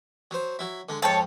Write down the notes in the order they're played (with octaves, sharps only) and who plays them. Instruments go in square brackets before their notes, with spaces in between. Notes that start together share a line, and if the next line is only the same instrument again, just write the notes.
[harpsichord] F#3 C5
F#3 E4
D3 G#3
[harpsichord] F2 G#2 G5 [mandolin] C#5 A5